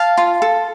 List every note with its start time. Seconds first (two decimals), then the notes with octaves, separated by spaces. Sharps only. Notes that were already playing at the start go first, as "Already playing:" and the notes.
Already playing: F5 A5
0.17 F4
0.42 A4